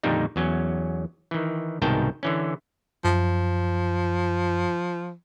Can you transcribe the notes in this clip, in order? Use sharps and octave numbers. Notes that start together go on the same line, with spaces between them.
F2 A#2 D3 D#3 G3 D#4
E2 F#3 C#4
D#3 E3
C2 G#2 B2 D#3 G5 A5
D3 E3 C#4
F#2 F3